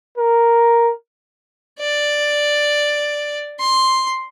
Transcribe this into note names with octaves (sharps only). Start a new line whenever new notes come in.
A#4
D5
C6